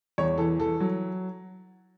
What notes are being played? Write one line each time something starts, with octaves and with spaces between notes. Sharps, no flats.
E2 C#5
E3 A4
E3 A4
F#3